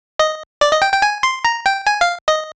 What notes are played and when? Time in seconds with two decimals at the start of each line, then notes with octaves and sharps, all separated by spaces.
0.19 D#5
0.61 D5
0.72 D#5
0.82 G5
0.93 G5
1.02 G#5
1.23 C6
1.45 A#5
1.66 G5
1.87 G#5
2.01 F5
2.28 D#5